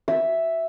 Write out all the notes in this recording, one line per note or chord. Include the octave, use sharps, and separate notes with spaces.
E5